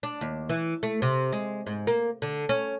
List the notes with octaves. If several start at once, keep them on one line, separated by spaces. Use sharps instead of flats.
D4
D#2
E3
A3
C3
G#3
G#2
A#3
D3
C#4